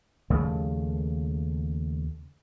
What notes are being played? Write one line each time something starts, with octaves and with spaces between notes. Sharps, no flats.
D#2 C#3 F3 A3